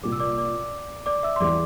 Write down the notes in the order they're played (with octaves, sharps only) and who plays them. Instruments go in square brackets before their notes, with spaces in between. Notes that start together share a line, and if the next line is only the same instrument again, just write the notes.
[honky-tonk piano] C2 A#2 G3 [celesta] D6
[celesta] E6
D5 D6
D5 D6
D5 D6
E5 E6
C6
[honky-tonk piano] E2 E3 G3 [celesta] D5 D6